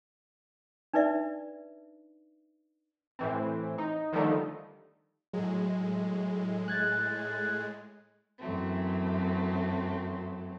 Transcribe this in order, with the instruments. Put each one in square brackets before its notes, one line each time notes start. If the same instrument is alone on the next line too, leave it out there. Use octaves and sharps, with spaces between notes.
[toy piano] D4 D#4 B4 D5 E5
[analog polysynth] A2 E3 C4
D#4
D3 D#3 F3 G3 A3 D#4
[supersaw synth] A2 G#3 [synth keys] F#3
[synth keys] F#6 G#6 A6
[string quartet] F#2 E3 F#3 A3 C4